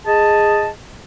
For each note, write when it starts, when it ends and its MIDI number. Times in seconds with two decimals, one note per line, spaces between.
0.06 0.68 68
0.06 0.68 75
0.06 0.68 81